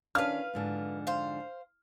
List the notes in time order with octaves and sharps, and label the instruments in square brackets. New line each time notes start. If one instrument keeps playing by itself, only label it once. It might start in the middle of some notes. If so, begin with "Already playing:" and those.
[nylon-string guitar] D#3 C#4 D4 [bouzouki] B4 F5 [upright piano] F6
[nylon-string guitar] F2 G#2 D3
[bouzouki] C5 F5